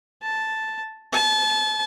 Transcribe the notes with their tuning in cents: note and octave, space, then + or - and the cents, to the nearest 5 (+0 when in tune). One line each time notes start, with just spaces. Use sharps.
A5 +0
A5 -35